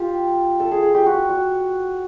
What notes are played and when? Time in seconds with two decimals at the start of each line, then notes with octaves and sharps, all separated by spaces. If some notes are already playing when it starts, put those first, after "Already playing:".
Already playing: F4 G4
0.60 A4
0.71 G#4
0.83 G#4
0.95 G4
1.06 F#4
1.29 F#4